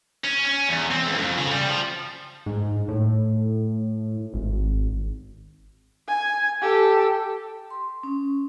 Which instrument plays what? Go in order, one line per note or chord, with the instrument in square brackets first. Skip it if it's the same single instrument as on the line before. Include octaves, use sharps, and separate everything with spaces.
[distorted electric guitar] C#4
C#4
E2
C4
C#2
F2
C#3
G3
F3
[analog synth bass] G#2
A2
G#1
[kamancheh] G#5
G4 A4
[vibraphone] C6
C#4